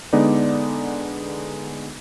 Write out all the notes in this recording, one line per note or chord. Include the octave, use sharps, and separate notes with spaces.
D3 G#3 B3 D#4 D5